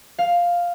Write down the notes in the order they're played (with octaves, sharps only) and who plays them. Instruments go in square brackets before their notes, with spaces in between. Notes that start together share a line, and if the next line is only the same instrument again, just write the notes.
[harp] F5